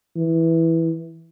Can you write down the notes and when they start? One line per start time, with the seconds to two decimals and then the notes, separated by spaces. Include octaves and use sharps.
0.16 E3